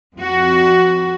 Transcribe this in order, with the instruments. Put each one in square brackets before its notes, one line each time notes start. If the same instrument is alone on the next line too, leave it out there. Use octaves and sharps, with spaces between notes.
[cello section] F2 F#4